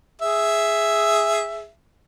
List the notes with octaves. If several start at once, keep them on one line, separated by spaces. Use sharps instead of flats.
G#4 E5